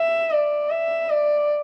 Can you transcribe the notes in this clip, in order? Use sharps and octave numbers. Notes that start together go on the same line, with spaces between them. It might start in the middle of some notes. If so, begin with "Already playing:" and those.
Already playing: E5
D5
E5
D5